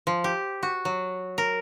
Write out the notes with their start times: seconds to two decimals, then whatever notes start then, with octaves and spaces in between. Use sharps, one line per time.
0.07 F3
0.24 G4
0.63 F#4
0.85 F#3
1.38 A#4